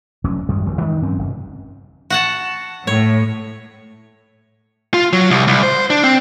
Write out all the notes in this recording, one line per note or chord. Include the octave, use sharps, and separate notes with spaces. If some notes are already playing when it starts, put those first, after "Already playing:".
F1 D2 F#3 C#4
G#1 F#2 G3 G#3
A#1 D#2 A#2 F3
G2 D#3 G#3
G2 F#3 C4 C#4
F1
F#4 F#5 A5
A2 C#5
F4
F#3
C2
C2
C5
D4
C4